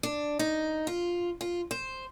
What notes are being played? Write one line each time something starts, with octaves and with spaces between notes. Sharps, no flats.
D4
D#4
F4
F4
C5